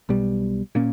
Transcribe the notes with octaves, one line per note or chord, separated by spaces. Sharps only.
B1 B2 G3
A#2 A#3 C#4